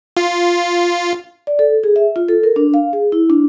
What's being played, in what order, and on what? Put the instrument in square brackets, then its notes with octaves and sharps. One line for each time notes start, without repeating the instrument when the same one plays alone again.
[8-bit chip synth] F4
[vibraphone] D5
A4
G#4
E5
F4
A4
A#4
D4
F5
G#4
E4
D4